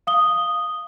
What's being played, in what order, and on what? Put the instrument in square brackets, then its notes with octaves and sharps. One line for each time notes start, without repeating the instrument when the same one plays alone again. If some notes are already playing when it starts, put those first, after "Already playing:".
[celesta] F5 D#6 G7